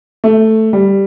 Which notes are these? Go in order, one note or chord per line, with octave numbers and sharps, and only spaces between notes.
A3
G3